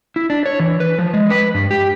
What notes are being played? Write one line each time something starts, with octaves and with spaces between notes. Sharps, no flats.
E4
D4
C#5
E3
B4
F3
G#3
B4
G2
G4